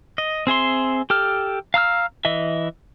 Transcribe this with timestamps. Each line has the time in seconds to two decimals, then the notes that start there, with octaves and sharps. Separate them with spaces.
0.18 D#5
0.47 C4 G#4 E5 C6
1.10 G4 A4 F6
1.74 F5 A#5 E6 F6
2.25 E3 D#5 E5